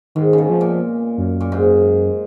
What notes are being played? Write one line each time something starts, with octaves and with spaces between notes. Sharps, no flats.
G#2 D#3
C#3
B2
F3
A#2
F#2
A#2
G#2